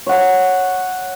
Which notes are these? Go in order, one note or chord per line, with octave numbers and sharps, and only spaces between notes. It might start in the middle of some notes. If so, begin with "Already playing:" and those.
C#5 F#5